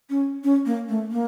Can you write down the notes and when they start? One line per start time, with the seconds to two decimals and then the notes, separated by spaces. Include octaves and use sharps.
0.10 C#4
0.44 C#4
0.66 A#3
0.89 A3
1.12 A#3